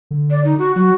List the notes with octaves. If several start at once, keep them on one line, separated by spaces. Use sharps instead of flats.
D3
D5
D#4
F#4
F#3 F#4